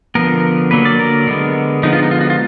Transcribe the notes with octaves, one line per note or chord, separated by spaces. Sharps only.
D3 F3 B3 A#4
D3 F#3 A#3 B4
D5
A#4
D3 G#3 B3
D3 F3 G#3 B3 D#4
F4
D#4
F4
F#4
F4